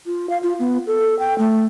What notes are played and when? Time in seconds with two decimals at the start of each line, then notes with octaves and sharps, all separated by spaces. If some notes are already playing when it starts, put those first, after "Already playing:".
0.06 F4
0.30 F5
0.43 F4
0.59 B3
0.87 A4
1.19 G5
1.38 A3